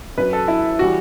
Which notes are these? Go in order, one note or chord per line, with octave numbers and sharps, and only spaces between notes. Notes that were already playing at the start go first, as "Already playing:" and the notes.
F#2 F#3 B4
A4
E4
E3 G3 F#4